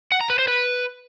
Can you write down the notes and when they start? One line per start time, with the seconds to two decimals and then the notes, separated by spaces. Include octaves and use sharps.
0.12 F#5
0.21 A#5
0.30 B4
0.39 C5
0.48 B4